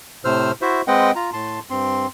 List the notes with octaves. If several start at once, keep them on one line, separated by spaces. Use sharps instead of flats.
A2 C3 C5 E6 F6
E4 F#4 C5 E5
G#3 C4 B4 D#5 F#5 G5
F4 A#5
A2 A5 C6
G2 C4 C6